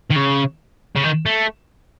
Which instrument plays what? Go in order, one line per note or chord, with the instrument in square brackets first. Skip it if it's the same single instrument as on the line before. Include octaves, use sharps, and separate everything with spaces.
[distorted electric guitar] D#3
C#3
C#3
D#3
A3